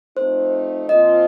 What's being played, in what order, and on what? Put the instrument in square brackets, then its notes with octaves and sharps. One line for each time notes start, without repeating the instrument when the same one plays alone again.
[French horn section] F3 A3 C4 D#4 [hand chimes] C5
[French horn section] A#2 F3 C4 F4 [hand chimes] D#5